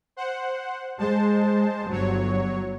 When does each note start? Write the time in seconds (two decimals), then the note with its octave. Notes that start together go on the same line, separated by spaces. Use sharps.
0.17 C5 F#5
0.98 G#3 C5 A5
1.89 G1 F#3 C#5